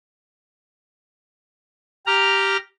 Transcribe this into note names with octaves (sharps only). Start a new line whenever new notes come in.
G4 A#5 F6